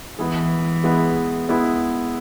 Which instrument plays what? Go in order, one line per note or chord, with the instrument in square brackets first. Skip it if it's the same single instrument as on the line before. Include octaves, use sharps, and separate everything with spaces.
[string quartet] E3 [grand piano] G#3 B3 E4 G#4
[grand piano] G#3 B3 E4 G#4
G#3 B3 E4 G#4